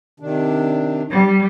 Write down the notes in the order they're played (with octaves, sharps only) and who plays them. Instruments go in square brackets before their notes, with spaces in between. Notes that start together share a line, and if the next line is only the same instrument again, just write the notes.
[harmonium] C3 D#3 D4
[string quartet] G3